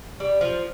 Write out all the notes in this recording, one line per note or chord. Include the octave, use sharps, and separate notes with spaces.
G3
F3